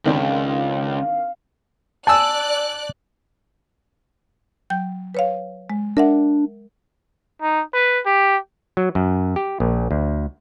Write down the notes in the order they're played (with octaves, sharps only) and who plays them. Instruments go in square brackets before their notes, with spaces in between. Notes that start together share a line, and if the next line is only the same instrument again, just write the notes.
[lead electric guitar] C#2 [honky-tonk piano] D#3 C4 D4 [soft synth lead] F5
[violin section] D5 F#6 [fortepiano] G#5 E6 [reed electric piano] A5
[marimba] F#3 G5 G6
B4 C#5 F5
G#3
[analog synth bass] D4 [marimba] A#4 E5 F#5
[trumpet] D#4
B4
G4
[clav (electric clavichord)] F#3
F#2
G4
A#1
D2